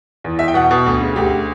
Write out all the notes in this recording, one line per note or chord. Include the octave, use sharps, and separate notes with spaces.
E2
E2 E5
G5
B2 F#5
B2
D2
C#3
D2 G4